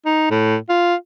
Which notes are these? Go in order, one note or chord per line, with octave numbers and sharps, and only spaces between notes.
D#4
A2
F4